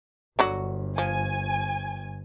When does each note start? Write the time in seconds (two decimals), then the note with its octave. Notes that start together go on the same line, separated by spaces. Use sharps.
0.39 G1 D3 F#3 F#4
0.98 F3 G#5